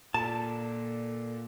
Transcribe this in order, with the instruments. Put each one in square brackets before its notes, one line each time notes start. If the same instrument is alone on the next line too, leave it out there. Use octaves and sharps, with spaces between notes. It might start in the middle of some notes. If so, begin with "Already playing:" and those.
[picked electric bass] A#2 [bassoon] D3 [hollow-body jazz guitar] A5